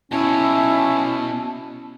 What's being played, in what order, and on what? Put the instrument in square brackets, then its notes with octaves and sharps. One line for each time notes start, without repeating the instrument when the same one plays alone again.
[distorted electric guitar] B2 C#5 [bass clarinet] C#4 [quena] E4 [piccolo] A5